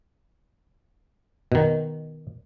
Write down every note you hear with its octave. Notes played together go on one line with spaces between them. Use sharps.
B2 D#3